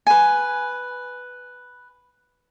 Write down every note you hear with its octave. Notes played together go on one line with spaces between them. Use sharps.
B4 G#5